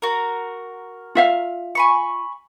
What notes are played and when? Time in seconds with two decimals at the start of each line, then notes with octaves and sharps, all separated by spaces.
0.02 F#4 A#4
1.15 F4 E5 F5
1.75 G#5 B5 C#6